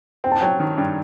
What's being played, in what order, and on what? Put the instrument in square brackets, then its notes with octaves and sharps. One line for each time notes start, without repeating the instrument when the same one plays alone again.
[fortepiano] C4 [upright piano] G5
[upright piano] A5
[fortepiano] F#3 [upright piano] G5
[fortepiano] D#3
G2